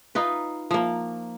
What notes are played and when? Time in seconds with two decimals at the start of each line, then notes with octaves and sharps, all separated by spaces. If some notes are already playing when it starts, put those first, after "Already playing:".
0.15 D#4 F4 B4
0.71 F3 A#3